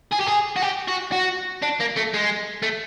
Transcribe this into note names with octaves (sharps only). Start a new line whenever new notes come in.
G#4
G4
G#4
F#4
G4
F#4
F#4
D4
A#3
A3
G#3
A3